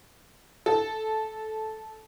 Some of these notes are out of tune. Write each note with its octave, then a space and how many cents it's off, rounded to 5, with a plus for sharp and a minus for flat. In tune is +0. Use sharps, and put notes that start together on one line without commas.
A4 -10